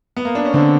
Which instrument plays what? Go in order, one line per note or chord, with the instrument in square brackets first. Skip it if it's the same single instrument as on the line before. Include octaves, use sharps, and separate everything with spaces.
[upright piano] B3
A#3
D4
C#4
[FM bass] D3 [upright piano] C4